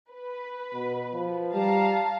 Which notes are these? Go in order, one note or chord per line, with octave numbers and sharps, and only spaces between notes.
B4
B2
F3
G3 F5 A5 A#5